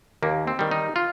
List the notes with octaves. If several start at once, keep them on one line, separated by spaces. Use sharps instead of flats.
D#2 A#3
C4
D#3 G3
D#4
F4